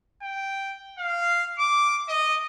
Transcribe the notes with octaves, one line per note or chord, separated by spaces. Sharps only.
G5
F5
D6
D#5